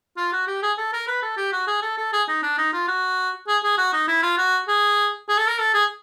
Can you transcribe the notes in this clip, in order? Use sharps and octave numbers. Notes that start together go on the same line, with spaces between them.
F4
F#4
G4
G#4
A4
A#4
B4
A4
G4
F#4
G#4
A4
A4
G#4
D#4
D4
D#4
F4
F#4
G#4
G#4
F#4
D#4
E4
F4
F#4
G#4
G#4
A4
A#4
A4
G#4